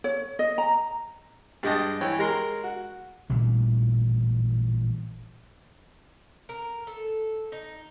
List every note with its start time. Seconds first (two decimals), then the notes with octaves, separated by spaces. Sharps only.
0.04 C#5
0.39 D#5
0.58 A#5
1.63 G2 G#3 G4 D#5 A5
2.01 E3 C#5 G5
2.19 G#3 A#4 C6
2.64 F#4
3.29 A1 A#2 E3 G3
6.49 A#4
6.87 A4
7.52 D#4